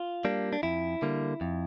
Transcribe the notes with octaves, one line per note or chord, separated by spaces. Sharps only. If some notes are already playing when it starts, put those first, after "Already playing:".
Already playing: F4
G3 A#3 D4
D4
F2 E4
D3 G3 A#3
F2